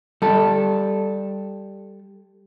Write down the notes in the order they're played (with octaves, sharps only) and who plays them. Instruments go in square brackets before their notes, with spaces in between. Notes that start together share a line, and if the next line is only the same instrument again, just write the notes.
[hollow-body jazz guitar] G3 A4